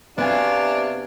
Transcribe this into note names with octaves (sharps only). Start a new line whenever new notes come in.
C3 B3 D4 F#4 F5 G#5